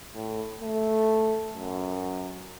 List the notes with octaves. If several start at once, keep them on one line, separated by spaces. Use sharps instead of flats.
A2
A3
F#2